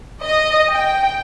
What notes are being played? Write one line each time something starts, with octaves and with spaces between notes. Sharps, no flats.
D#5
G5